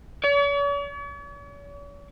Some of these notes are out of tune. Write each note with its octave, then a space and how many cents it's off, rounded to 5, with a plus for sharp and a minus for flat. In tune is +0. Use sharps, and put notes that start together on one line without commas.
C#5 +45